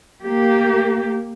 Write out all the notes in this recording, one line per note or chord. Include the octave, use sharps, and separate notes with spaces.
A#3 G4